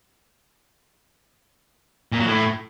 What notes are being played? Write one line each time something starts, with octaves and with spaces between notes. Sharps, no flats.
A#2
F#3
A2